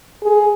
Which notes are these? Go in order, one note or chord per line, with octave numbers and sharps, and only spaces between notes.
G#4